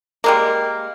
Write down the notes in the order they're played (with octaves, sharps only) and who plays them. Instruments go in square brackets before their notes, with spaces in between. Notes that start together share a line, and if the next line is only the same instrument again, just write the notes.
[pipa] G3 G#3 A#3